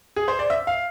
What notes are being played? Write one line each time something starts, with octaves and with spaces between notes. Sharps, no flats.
G#4
C5
D5
E5
F5